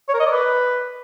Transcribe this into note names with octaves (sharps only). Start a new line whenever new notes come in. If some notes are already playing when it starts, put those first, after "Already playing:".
C#5
A#4
D#5
D5
B4